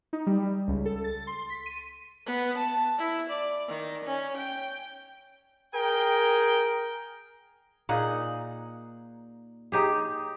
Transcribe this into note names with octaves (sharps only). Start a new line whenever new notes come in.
D#4
G3
C#2
A4
A6
C6
B6
D#7
B3
A5
E4
D5
D#3
C#4
G5
G#4 A#4 G5
A#2 D#4 G#4 F#5
D#4 G4 G#4